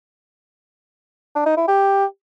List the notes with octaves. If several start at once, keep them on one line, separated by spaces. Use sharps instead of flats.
D4
D#4
E4
G4